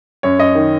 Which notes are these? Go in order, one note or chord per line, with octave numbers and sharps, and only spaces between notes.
F#2 C#5
F#2 D#5
D#3